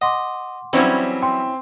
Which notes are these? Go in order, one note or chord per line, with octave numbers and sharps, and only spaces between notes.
D#5 F#5 C6 D6
E3 F#3 G3 C4 C#4 E4
G5 C6